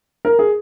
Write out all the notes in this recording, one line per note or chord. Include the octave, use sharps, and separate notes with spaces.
A#4
G#4